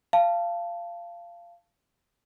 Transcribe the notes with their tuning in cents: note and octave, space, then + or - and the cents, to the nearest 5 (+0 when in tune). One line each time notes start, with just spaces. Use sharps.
F5 -20 A5 +0